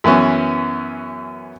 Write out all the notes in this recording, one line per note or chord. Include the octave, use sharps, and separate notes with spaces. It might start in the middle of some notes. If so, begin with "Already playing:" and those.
F#2 E3 B3 C#4